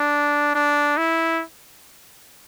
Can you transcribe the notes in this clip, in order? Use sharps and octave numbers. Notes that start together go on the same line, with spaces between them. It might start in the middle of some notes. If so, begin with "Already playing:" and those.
Already playing: D4
D4
E4